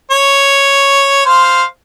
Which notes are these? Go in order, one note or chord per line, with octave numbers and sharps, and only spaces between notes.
C#5
C5 F5